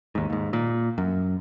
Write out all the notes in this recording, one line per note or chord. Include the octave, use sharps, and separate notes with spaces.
D#2 G#2
D#2 G#2
A#2
F#2